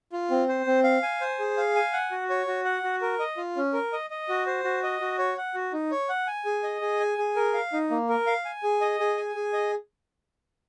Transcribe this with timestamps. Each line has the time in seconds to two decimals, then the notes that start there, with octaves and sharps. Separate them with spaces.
0.12 F4
0.31 C4
0.49 C5
0.67 C4
0.84 F5
1.03 G#5
1.21 C5
1.39 G#4
1.57 F5
1.75 G#5
1.93 F#5
2.11 F#4
2.30 C#5
2.47 F#4
2.65 F#5
2.84 F#4
3.01 A#4
3.19 D#5
3.37 F4
3.56 C#4
3.73 A#4
3.93 D#5
4.10 D#5
4.29 F#4
4.46 C5
4.64 F#4
4.83 D#5
5.00 F#4
5.19 C#5
5.37 F#5
5.54 F#4
5.73 D#4
5.91 C#5
6.09 F#5
6.27 G#5
6.45 G#4
6.63 D#5
6.81 G#4
7.00 G#5
7.18 G#4
7.36 A#4
7.54 F5
7.73 D#4
7.90 A#3
8.09 A#4
8.27 F5
8.45 G#5
8.63 G#4
8.81 D#5
9.00 G#4
9.17 G#5
9.35 G#4
9.53 D#5